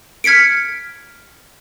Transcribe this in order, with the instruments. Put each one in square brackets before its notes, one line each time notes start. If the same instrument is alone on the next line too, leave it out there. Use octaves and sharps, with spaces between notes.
[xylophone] F6 G#6 B6 C#7 D7